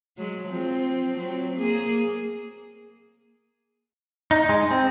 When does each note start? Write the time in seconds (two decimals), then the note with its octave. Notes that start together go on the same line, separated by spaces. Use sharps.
0.18 F#3 G#3
0.49 F3 C4
1.17 F#3 C4
1.56 A#3 G#4
4.31 D#4
4.49 G#3
4.71 C4